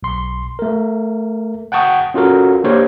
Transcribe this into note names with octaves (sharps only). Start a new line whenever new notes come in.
B1 C6
A3 A#4
F#5 G5 A5 C#6 D#6
C#4 F4 F#4 A4 A#4
A#3 D4 G4 A#4 C5 C#5